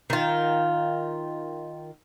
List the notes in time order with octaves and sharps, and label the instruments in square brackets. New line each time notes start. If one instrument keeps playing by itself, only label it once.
[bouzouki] D#3 F4